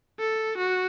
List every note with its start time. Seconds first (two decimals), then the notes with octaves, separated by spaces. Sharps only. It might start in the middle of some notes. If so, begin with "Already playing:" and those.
0.19 A4
0.57 F#4